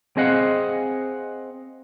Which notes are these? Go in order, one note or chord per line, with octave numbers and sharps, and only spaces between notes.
C4 G#4 D#5 F5 F#5